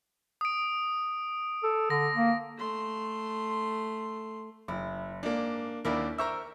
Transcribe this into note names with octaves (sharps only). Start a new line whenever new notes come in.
D#6 D7
A4
D3 A#6
A#3
A3 C6
F#1 E4
G#2 A#3 D4
D#2 A#3 C#4 D4 E4 A#4
A#4 C5 E5 A#5 C#6 E6